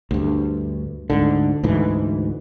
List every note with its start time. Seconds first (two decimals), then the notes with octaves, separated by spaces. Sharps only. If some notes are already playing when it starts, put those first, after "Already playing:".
0.11 D2 G2
1.10 D2 G#2 D3
1.63 D2 G#2 E3